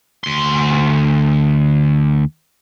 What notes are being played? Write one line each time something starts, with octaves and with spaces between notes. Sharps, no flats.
D2 C6